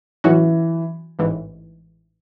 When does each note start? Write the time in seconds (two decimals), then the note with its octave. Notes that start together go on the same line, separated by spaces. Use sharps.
0.24 A2 E3 F#3 C#4 F#4
1.19 A1 G#2 E3